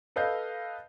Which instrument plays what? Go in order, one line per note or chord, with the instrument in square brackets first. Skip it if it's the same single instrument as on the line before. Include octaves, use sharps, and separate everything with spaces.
[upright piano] A4 B4 D#5 F5 G6